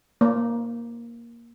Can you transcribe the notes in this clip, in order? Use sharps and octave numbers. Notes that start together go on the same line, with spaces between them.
A#3